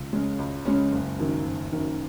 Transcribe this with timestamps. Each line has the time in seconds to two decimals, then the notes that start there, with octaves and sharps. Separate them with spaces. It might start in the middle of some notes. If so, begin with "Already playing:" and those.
Already playing: C#2
0.13 C#3 G#3 C#4
0.38 C#2
0.65 C#3 G#3 C#4
0.92 F#1
1.19 F#2 D#3
1.45 F#1
1.72 F#2 D#3